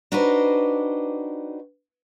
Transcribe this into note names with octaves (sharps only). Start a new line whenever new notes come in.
D4 D#4 F#4 G4 B4 C5